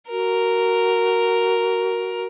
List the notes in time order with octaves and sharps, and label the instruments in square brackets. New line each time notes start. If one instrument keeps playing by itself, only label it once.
[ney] F#4 [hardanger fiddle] A#4